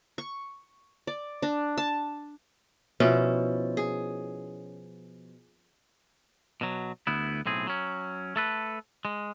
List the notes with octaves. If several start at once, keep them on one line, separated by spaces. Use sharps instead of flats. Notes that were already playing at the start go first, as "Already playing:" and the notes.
C#6
D5
D4
A5
B2 F3 C#4 E4
G#4
B2 F#3
D2 B3 E4
B1 A2 C4 G#4
F#3 C#4
A3 A4 B4
G#3